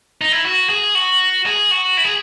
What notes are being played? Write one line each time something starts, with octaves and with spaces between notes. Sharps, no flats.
D#4
E4
F#4
G#4
F#4
G#4
F#4
E4
G#4